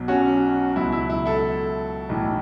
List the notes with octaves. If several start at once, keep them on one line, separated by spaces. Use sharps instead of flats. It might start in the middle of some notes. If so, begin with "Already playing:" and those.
Already playing: B1 B2 F#3
C#4 F#4
C#2 B2 F#3 E4
E4
E4
E4 A4
B1 A2 E3